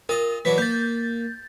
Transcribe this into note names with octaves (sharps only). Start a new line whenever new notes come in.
F4 A#4 D#5
E3 F#3 D4 B6
A#3 G6 A6